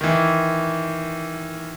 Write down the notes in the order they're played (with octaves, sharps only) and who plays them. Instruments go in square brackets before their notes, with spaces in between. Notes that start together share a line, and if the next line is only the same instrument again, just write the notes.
[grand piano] D#3 E3